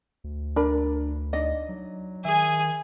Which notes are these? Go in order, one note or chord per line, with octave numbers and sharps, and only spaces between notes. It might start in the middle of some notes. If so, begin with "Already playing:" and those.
D2
D4 A#4 B5
D4 D#4 D5 D#5
F#3
D#3 G#4 E5 G#5